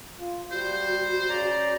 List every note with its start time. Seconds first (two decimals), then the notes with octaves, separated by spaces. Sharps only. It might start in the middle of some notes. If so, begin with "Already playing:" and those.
0.20 F4
0.52 G3 F#4 C5
1.29 C#3 D5 A#5